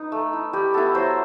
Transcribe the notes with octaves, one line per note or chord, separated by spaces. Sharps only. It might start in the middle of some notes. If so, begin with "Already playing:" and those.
Already playing: D#4 B4
A3
E4
G3 G4
B3 E4 A4
F#3 C5